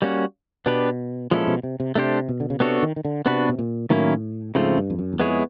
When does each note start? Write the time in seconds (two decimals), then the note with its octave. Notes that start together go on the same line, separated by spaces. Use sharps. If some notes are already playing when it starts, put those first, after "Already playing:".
0.02 G3 A#3 C#4 F#4
0.66 B2 B3 D4 G4 B4
1.31 A#2 F3 G#3 C#4 E4 A4
1.47 B2
1.63 C3
1.80 C3
1.95 C3 A3 D4 G4 C5
2.29 B2
2.40 D3
2.50 C#3
2.60 C3 B3 D4 F#4 A4 C#5
2.83 D#3
2.96 D#3
3.05 D3
3.25 C3 B3 D4 F#4 B4
3.49 B2
3.59 A#2
3.90 A2 D#3 F#3 A#3 C#4 E4
4.55 G#2 C#3 F3 A3 C4 F4
4.77 G2
4.90 F2
4.99 F#2
5.13 E2
5.20 F2 G#3 B3 E4 G#4 C#5